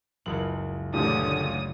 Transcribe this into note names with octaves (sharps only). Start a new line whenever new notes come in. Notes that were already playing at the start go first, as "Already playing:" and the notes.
F#1 C#2 F#7
A1 D2 A#2 D3 G4 D#6